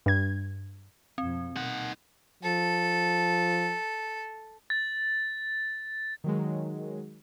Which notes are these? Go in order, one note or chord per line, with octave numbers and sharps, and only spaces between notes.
G2 G#6
F2 B2 F3 C4
B2 D#3 A#3 D#4 F#5
F3 A4
A6
D#3 F#3 G#3